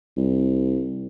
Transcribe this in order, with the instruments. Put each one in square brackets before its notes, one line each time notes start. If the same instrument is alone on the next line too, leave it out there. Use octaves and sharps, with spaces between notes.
[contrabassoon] C2